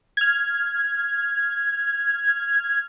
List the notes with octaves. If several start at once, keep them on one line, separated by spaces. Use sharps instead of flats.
F6 G#6